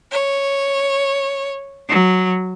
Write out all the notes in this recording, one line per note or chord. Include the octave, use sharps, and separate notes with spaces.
C#5
F#3